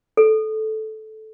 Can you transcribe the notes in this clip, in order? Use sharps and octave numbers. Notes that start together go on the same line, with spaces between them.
A4